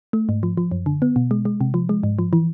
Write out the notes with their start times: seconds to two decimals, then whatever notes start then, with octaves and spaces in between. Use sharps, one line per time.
0.13 A3
0.29 G#2
0.43 F3
0.57 F3
0.71 F#2
0.86 D3
1.02 B3
1.16 B2
1.31 G#3
1.45 G#3
1.61 C3
1.74 F3
1.89 G#3
2.03 G#2
2.19 F3
2.33 E3